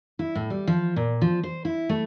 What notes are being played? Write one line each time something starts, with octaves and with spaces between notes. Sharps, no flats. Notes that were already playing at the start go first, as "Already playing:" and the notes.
E4
A2
G3
F3
A#2
F3
C5
E4
A3